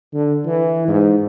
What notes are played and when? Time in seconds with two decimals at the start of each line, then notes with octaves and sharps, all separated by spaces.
0.13 D3
0.45 E3
0.88 G#2